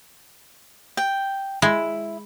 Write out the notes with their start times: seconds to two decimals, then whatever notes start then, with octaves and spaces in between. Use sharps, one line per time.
0.97 G5
1.62 G#3 E4